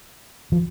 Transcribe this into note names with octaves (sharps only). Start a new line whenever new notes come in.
F3